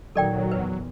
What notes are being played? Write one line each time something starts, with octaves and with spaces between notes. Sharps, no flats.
A#2 D#3 F#3 A4 D5 G5
E2 B4